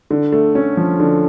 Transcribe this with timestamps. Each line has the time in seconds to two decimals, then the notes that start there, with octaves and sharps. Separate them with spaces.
0.11 D3
0.32 A3
0.55 C#4
0.77 F3
1.00 D3